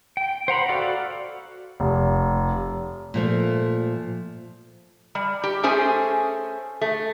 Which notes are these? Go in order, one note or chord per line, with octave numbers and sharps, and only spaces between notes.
G5
C5 F#5 A#5 B5
F#4 A4 D5 F5 F#5
F1
A#2 F3 A3
G3
G4
A3 C#4 G#4 C5 G#5
A3